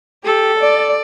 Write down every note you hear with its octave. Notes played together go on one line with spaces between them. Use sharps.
G4 A4
D5